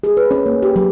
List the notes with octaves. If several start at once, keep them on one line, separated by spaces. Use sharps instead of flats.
G#4
B4
C#4
A#3
G4
F#3